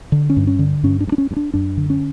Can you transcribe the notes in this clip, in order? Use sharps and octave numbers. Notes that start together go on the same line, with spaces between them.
D3
C#4
G2
C#4
D3
G2 C#4
D4
G2
D4
C#4
G2
D4
F#2 D4
D3
C#4